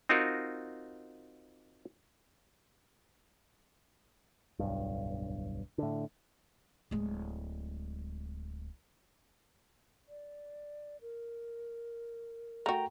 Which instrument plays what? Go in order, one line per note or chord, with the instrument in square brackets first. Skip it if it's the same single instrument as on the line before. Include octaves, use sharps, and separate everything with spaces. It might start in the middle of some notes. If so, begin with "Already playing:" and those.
[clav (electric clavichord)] C4 D#4 F4 F#4 A#4
[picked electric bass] D1 B1 G2
A2 D3
[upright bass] D1 G#3
[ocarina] D5
A#4
[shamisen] A3 F#4 [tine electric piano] G5 A#5